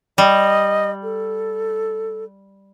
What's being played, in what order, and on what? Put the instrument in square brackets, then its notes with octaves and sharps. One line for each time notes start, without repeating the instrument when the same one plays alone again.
[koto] G3 [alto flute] D#5
[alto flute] A4